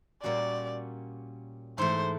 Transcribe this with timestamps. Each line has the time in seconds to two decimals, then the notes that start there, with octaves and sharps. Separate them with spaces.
0.23 A#2 G3 A#3 C#4 F#4 D5
1.78 G#2 E3 A3 C5